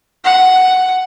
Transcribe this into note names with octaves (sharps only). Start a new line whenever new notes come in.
F#5